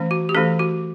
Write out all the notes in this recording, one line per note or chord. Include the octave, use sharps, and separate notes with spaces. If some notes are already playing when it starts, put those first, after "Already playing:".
Already playing: E3 A3 C#4
F#4
G4
E3 A3 C#4 A4
F#4